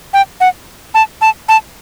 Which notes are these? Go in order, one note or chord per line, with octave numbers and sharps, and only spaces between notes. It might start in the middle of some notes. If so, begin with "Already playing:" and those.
G5
F#5
A5
A5
A5